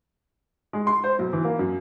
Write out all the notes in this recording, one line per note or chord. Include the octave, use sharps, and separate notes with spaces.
G#3
C6
C5
B1
E3
A#3
F#2